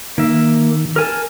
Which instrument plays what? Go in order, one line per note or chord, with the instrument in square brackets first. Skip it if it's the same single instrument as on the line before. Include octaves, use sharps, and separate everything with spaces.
[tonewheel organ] D#3 [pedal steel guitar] A#3 E5
[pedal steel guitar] A#4 G#5 A5